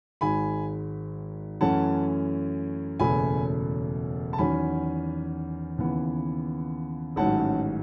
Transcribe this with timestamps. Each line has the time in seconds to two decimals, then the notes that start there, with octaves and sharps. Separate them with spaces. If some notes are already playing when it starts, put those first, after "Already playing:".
0.21 G#1 G#2 D#3 G#3 G#5 B5
1.61 F#2 E3 A3 C#4 F#5 A5
2.99 F#1 E2 B2 A3 C#4 G#5 B5
4.33 A5
4.38 E2 D#3 F#3 C#4 G#5 B5
5.78 D#2 C#3 E3 B3
7.16 A1 G#2 D#3 F#3 C#4 F#5 A5